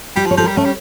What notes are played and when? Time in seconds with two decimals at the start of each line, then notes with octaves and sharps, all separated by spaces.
0.16 G3 G4
0.26 F3
0.31 C#5
0.37 F3 A4
0.44 A#4
0.48 G3
0.57 A3 C#4
0.65 G3